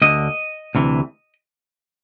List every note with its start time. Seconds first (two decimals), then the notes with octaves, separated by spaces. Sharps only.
0.02 D2 D3 D#5
0.75 D2 C3 E3